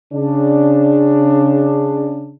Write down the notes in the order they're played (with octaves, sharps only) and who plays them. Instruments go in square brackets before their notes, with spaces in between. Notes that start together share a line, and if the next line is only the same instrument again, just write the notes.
[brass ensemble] C#3 D4